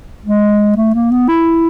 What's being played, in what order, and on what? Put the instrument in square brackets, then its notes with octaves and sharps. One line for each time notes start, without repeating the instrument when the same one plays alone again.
[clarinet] G#3
A3
A#3
B3
E4